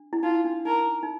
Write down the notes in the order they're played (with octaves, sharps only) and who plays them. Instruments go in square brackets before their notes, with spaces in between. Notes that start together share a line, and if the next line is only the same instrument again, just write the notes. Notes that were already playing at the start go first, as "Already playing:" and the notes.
Already playing: [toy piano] D4
E4
[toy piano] D#4 [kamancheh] F4
[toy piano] D4
[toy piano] D#4 [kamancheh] A#4
[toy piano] D#4